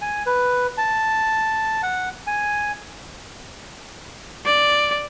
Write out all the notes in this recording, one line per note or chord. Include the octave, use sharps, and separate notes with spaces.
G#5
B4
A5
F#5
G#5
D5